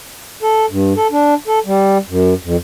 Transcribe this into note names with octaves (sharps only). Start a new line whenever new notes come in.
A4
G2
A4
D4
A4
G3
F#2
F2